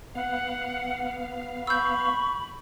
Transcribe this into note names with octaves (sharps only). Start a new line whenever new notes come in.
B3 F5 F#5
B5 C#6 E6 G6